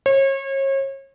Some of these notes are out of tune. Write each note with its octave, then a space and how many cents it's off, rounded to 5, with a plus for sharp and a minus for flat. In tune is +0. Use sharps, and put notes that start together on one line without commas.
C#5 -35